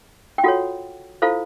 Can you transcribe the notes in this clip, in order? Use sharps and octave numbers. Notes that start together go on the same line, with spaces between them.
G5
F4 F#4 A4 C#5 F#5
E4 F4 A4 C5 F5